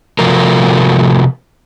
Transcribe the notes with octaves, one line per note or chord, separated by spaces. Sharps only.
C3 F3 A3 F4 F#4 A#4